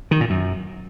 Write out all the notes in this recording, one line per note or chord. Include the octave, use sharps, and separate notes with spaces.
D#3
A#2
F#2